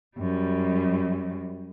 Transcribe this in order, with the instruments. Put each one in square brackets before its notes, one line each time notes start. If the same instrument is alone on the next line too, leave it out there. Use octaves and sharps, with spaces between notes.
[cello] F#2 G3